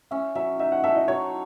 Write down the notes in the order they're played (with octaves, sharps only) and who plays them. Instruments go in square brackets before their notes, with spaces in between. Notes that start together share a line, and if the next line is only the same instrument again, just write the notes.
[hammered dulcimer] C#4 [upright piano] E5
[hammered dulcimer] F#3 [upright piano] E5
[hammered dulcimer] D#4 [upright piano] E5
[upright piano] F#5
[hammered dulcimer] A4 [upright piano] E5
[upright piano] D#5
[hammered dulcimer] F#3 [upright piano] C#5